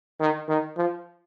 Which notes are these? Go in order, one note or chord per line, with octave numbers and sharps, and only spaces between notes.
D#3
D#3
F3